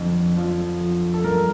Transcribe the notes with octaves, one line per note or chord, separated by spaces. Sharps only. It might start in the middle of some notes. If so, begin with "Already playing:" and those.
Already playing: F2 D3
F3
F3
A4
G2 A#4